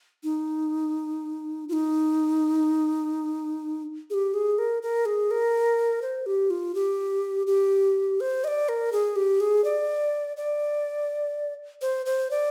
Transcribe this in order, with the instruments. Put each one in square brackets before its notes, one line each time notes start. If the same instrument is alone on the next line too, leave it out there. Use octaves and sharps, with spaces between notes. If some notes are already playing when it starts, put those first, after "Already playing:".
[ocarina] D#4
F4
D#4
G#4
G4
G#4
A#4
A#4
G#4
A#4
C5
G4
F4
G4
G4
C5
D#5
D5
A#4
G#4
G4
G#4
D5
D5
C5
C5
D5